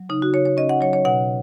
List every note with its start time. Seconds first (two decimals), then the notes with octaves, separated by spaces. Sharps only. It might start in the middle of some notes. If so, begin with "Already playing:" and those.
Already playing: F#3
0.09 C#3 D#4
0.22 F#4
0.34 C#3 C#5
0.45 C#5
0.57 C#4 D#5
0.69 F#5
0.81 F#3 C#5
0.93 C#5
1.05 B2 F#5